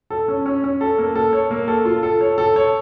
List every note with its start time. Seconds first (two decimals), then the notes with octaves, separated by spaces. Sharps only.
0.10 A4
0.28 C#4
0.46 C#4
0.64 C#4
0.81 A4
0.98 A#3
1.15 A4
1.33 C#5
1.51 A#3
1.68 A4
1.85 F4
2.03 A4
2.21 C#5
2.38 A4
2.56 C#5